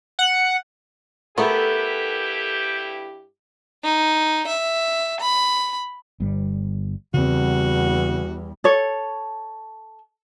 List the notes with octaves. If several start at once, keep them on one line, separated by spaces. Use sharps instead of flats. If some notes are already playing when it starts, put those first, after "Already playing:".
F#5
G2 A3 B3 E4 G4 A4 A#4
D#4
E5
B5
G1 G3
E2 C#3 G3 C4 F#4
A4 C#5